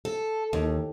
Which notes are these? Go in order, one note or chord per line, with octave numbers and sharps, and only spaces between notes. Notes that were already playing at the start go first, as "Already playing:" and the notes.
A4
D#2